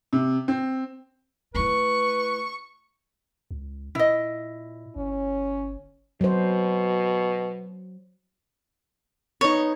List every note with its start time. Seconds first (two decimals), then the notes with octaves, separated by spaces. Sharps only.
0.13 C3
0.48 C4
1.55 A3 E4 B4 C#6
3.51 C#2
3.95 A#2 E4 D#5
4.96 G1 C#4
6.21 B2 F#3 C5
9.41 B3 D#4 C#5